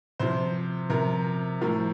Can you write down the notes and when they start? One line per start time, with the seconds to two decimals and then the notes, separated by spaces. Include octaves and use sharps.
0.19 C3 F3 C5
0.90 C3 F3 A#4
1.61 A2 F3 A#4